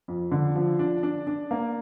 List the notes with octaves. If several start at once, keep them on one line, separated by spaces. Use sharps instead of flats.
F2
D3
F3
D4
D4
D4
A#3